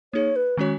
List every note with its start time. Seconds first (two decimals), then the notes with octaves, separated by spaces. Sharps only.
0.13 A#3 D#4 G#4 C#5
0.36 B4
0.57 D#3 G#3 C#4 F#4 C#5